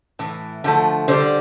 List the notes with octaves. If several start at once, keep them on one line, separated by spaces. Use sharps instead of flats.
A2 E3
D3 F3 A3
D3 G3 C5